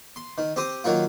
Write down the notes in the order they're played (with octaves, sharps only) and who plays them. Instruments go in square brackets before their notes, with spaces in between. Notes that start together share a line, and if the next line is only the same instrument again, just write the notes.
[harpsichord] C6
D#3
C4 G4 C5 D#6
D#3 F#3 A#3 F4